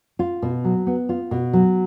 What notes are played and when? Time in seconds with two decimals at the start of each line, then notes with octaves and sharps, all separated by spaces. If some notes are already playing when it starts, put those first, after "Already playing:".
0.19 F4
0.42 B2
0.64 F#3
0.87 B3
1.09 F4
1.31 B2
1.53 F#3